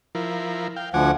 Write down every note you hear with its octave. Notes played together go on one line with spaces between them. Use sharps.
F3 E4 A#4
F5 G5
D2 F3 F#5 G#5 D6